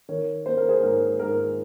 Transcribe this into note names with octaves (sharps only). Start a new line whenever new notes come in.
D#3 A#4 C#5
A#3 C5
A#4
G#4 C5
G#2 A#4
G#2 A#4